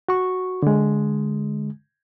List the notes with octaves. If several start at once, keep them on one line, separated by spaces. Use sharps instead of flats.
F#4 C#6
D3 G#3